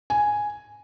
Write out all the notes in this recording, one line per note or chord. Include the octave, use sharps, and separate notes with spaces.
G#5